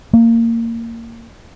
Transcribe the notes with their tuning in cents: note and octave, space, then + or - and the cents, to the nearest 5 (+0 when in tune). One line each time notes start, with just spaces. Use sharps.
A#3 -20